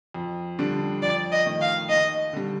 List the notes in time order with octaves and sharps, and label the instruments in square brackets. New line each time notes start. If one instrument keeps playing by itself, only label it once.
[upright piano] F2
D3 G3 D4
[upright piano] F2 [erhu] D5
[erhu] D#5
[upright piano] D#3 A3 D#4
[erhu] F5
[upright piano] D#2 [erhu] D#5
[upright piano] D3 G3